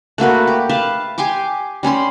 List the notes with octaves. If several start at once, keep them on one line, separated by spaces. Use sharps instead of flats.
A3 A#3 F#4 B4
G4
B4 F5 A5
G4 G#5 C6 D6
G3 C#4 B5 C6